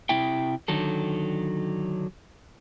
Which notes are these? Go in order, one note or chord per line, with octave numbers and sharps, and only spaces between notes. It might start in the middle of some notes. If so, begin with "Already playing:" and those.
C3 E4 E5 G5
D3 D#3 F#3 A4